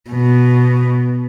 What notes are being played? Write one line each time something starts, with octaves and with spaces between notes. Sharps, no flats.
B2